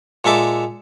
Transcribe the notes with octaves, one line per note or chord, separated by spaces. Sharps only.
A#2 G#3 A4 E5 D6